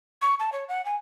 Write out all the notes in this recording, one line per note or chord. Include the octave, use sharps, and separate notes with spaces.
C#6
A5
C#5
F#5
G#5